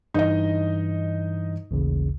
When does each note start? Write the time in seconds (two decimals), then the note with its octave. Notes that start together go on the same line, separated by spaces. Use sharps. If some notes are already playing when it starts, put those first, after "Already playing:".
0.14 G2 E3 D#4 D#5
1.71 A1 D#2 C#3